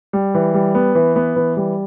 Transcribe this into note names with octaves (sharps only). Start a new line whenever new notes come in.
G3
E3
G3
B3
E3
B3
E3
G3